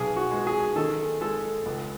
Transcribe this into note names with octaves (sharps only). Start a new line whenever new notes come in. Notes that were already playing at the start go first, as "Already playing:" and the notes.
Already playing: B1 G#4
F#4
G#3
G#4
D#3 A4
G#3 A4
C#2